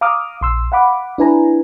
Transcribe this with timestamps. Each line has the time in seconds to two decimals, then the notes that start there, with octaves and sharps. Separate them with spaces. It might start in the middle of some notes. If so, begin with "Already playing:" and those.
0.01 F5 A#5 D6 D#6 F6
0.41 A#1 C6 E6
0.72 F5 F#5 B5 D6
1.18 D4 E4 B4 G#5 A#5